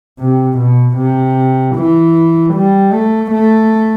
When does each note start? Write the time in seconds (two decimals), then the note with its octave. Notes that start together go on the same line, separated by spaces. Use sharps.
0.19 C3
0.58 B2
0.97 C3
1.76 E3
2.54 G3
2.93 A3
3.31 A3